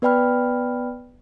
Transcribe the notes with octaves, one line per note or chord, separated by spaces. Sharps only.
B3 B4 D5 G5 B5 F6